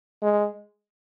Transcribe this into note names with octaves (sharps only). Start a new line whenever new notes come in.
G#3